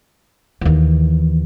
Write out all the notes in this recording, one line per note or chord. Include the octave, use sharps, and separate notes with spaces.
D#2 E3